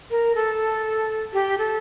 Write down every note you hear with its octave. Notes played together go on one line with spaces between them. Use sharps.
A#4
A4
G4
A4